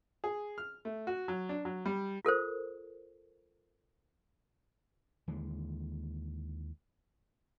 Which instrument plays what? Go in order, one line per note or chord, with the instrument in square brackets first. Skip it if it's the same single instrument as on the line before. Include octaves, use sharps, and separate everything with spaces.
[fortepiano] G#4
F6
A3
F#4
F#3
D4
F#3
G3
[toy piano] F4 A4 A#4 C5
[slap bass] D#2 D3 E3 G#3